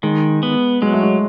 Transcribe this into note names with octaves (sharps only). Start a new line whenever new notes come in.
D#3 G#3
B3
F#3 G#3
A3
G#3